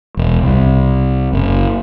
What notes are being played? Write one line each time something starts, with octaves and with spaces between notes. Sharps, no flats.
E1
C2
F#1